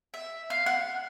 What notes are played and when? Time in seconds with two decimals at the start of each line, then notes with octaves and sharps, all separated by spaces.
0.14 E5
0.50 F5
0.66 F#5